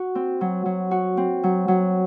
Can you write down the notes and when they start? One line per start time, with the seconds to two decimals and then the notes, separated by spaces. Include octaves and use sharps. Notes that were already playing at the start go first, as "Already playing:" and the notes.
Already playing: F#4
0.15 C4
0.41 F#3
0.65 F#3
0.91 F#4
1.17 C4
1.44 F#3
1.68 F#3